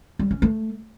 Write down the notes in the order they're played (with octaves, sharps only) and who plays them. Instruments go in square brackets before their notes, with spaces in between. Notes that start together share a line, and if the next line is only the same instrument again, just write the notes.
[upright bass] G3
C#4
A3